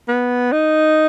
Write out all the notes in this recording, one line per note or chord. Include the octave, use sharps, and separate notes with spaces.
B3
D#4